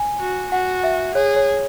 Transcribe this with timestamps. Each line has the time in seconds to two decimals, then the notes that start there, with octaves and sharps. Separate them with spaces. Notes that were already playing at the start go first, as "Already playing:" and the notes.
Already playing: G#5
0.20 F#4
0.51 F#4 F#5
0.84 E5
1.15 G#4 C#5
1.36 C#5